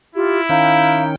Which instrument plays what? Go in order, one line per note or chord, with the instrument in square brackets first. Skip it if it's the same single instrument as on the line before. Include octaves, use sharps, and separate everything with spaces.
[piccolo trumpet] E4 [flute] F4 [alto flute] G4
[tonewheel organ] D#3 C#4 G5 [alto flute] F5 [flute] A#5